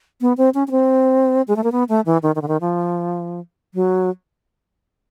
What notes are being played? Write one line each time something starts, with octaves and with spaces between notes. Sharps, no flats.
B3
C4
C#4
C#4
C4
G#3
A3
A#3
B3
A3
E3
D#3
D#3
D3
D#3
F3
F#3